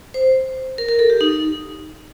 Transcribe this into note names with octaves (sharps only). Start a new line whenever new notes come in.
C5
A#4
A#4
A4
G4
D#4